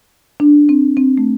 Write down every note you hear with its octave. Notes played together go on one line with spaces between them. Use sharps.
D4
C4
C4
A3